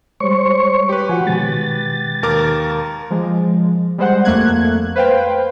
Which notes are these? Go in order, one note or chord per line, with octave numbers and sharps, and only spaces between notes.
G3 G#3 C5 C#5 C#6
G4 B4
F3 F#4 F#5 G#5
B2 D#3 G#3 A6
D#2 A#4 D6
F3 G#3
G3 G#3 C5 F#5
F2 A3 A#3 F#6 G#6
B4 C5 F5 G5